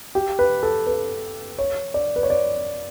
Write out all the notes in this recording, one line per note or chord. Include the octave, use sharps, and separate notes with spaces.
G4
B4
A4
B4
C#5
D5
B4
C#5
D5